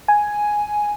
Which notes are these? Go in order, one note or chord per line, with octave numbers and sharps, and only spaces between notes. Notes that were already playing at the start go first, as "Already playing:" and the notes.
G#5